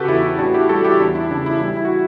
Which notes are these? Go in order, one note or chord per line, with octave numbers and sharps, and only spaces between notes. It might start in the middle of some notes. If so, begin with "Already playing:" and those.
Already playing: C#3 F#4 G4 A4 B4
E2 E4
E4
A2 D4 F#4
E4 G4
G3 F#4 A4
E4 G4
E2 D4
E4
C#3 D4
E4
G3 E4
E4
F#4